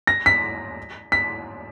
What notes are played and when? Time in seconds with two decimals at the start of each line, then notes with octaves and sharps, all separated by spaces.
0.07 A#6
0.26 B6
1.12 B6